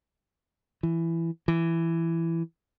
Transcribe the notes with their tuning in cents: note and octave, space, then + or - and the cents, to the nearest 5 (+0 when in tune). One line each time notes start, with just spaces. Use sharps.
E3 +10
E3 +10